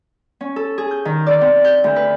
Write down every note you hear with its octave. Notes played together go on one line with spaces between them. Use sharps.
C#4
A4
G#4
G6
D#3
D5
C4
G6
D2
B4